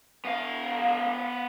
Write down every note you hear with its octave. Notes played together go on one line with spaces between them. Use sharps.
B3 F5